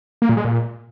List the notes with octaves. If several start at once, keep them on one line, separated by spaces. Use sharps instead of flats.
A#3
A#2
G#3
A#2